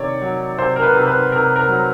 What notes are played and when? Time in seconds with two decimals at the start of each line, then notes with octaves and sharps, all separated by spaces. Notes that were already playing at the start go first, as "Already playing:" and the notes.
Already playing: C3 D#3 C#5 D5
0.22 F#3
0.59 C3 C5
0.76 A#4
0.83 B4
0.95 C3
1.07 B4
1.32 C3 A#4
1.56 A#4
1.68 F#3